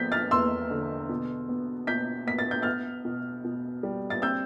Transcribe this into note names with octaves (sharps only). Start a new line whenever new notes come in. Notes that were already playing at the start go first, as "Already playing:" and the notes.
Already playing: F3 B3 G6 A6 B6
F6 A6
E2 C6 E6
D3
B2
B3
B2 G6 B6
B3 B6
A6
G6
B3 F6 A6
B2
B2
G3
A6
C4 E6 G6